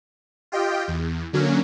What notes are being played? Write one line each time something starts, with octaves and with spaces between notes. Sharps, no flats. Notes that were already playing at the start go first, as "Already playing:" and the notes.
F4 G4 D#5 G5
E2
D3 F#3 A#3 C#4